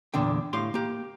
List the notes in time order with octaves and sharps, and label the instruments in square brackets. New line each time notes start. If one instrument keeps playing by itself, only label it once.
[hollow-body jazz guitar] E2 A#2 D3 D4 G5
A2 G4 F5 C6
A#3 G4